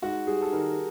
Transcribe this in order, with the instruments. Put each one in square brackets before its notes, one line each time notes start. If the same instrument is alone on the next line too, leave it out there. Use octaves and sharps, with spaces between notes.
[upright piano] G#2 [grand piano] F#4
[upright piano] G3 [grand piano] G#4
[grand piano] A4
[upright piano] D#3 [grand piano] A#4